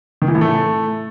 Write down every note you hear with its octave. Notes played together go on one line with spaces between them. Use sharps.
D#3
E3
A2
A3